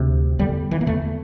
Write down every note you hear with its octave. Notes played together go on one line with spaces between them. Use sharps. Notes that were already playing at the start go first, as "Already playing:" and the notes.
Already playing: D2 C3
E2 D3 G3
E3
A#3
E2 D3 A3